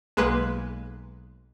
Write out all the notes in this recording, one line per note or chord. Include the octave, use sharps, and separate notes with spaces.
B1 G#3 A#3 B4